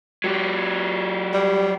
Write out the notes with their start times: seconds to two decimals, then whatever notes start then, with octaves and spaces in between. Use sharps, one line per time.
0.24 F#3 G4
1.34 G3